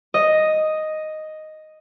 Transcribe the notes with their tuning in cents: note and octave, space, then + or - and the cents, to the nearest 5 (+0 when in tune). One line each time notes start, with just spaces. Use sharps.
D#5 +0 D#6 +0